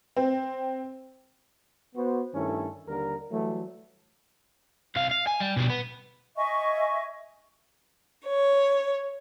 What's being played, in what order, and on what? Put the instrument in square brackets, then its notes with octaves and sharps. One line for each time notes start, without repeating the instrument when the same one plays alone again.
[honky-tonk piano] C4
[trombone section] B3 F#4 C5
G2 D#3 A3 C#4 E4 A4
D#2 D3 G3 A#4
E3 F#3 G3 A3
[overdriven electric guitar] C2 F5
F5
G#5
G3
B2 G3
B3
[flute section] D#5 E5 G#5 C#6
[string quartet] C#5